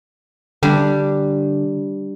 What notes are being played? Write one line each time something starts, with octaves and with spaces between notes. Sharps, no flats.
D3 G3 D4